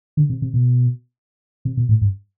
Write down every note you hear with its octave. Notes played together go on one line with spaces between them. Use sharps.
D3
C3
C3
B2
C3
B2
A2
G2